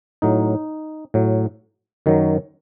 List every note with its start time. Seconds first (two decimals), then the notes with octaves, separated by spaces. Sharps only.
0.22 A2 F#3 D#4
1.14 A2 F#3
2.06 F#2 D#3 F#3